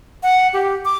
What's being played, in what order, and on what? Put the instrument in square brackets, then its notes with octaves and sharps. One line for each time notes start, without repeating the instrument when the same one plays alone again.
[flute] F#5
G4
D6